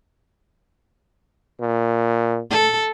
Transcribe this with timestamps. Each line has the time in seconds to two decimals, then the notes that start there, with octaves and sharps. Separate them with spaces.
1.61 A#2
2.50 A4